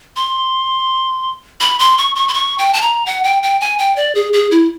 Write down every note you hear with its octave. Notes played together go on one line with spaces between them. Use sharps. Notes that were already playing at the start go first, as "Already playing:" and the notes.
C6
B5
C6
C#6
C#6
C6
C#6
G5
A5
A#5
F#5
G5
G5
G#5
G5
D5
G#4
G#4
E4